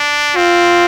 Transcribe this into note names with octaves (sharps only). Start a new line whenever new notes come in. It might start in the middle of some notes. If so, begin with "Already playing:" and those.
Already playing: D4
C4 F4